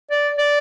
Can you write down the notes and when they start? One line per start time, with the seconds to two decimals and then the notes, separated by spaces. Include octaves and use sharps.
0.11 D5
0.38 D5